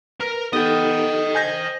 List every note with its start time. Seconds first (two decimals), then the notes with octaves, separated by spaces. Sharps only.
0.21 A#4 B4
0.53 B3 D#4 G4 A4 D#5 G5
1.35 C5 G#5 G6 A#6